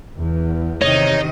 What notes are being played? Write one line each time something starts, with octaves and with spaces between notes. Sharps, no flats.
E2
C3 D#3 D#4 C#5 D#5